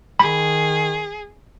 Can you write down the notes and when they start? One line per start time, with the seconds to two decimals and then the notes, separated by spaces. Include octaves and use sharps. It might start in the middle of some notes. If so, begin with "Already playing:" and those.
0.19 D#3 G#4 B5